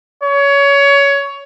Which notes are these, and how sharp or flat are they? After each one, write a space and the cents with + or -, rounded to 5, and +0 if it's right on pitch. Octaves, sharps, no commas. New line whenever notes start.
C#5 +20